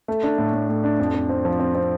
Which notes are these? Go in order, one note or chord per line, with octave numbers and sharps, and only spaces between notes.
A3
D4
A2
A2
A2
D4
F2
F2
C4
F3
C4
C4